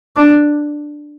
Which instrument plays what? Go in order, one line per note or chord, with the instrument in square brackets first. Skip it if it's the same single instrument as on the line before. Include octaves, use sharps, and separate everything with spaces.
[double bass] D4